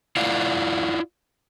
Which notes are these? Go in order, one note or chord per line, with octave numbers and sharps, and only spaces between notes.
E4 F4 D5 F5 F#5